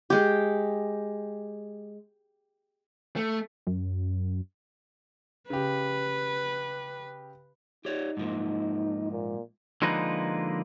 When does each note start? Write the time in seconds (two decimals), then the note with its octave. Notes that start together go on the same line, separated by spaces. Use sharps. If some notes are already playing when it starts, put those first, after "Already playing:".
0.10 G#3 G4
3.16 A3
3.67 F#2
5.50 C#3 G4 B4
7.85 D#4 G4 C#5 D5
8.17 G#2 F3 A#3
9.12 A#2
9.82 D3 F3 G#3 A#3 D#4 B4